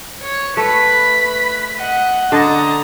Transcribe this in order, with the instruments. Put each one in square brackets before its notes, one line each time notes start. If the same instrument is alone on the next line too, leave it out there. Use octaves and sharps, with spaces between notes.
[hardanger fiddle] C#5
[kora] A3 [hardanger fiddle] B4 [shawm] B5
[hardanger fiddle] D#5 F#5
[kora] D3 [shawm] D#5 [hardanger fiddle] A5 A#5